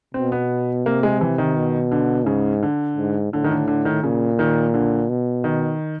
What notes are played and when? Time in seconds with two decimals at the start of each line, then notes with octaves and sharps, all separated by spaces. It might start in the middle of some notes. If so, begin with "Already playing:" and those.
0.14 B2 C4
0.32 B3
0.86 C3 A#3
1.03 G#3
1.21 E3
1.38 D#3
1.56 B2
1.92 D3
2.26 G#2 C#3
2.63 D3
2.97 G#2
3.33 A2 D3
3.44 D#3
3.51 D3
3.68 D3
3.85 D#3
4.03 A#2 C#3
4.39 D#3
4.74 D3
5.09 B2
5.44 D#3